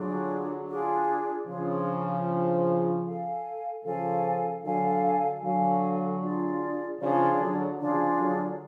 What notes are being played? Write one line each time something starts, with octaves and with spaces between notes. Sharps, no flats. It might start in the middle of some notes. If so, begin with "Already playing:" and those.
Already playing: D3 F#3 D4 F4 G#4
D4 F4 G#4
C#3 F3 D4 F4 G#4
D4 F4 G#4
A4 F5 G#5
C#3 F3 A4 F5 G#5
D3 F#3 A4 F5 G#5
D3 F#3 A4 F5 G#5
D4 F4 G#4 D5
C#3 F3 D4 F4 G#4 D5
D3 F#3
C#3 F3 D4 F4 G#4 D5
D3 F#3